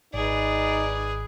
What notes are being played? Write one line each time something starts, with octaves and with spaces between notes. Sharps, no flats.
G#1 D#4 G#4 B4 D5